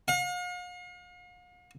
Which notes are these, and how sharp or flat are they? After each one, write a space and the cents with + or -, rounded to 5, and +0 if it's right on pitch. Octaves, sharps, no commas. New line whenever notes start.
F5 +45